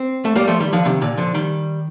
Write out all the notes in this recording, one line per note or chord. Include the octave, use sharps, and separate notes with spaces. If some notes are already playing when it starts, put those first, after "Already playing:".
Already playing: C4
A3
G3 A#3
F3 A3
D#3 G3
D3 F3
C3 D#3
A#2 D3
D3 F3
D#3 G3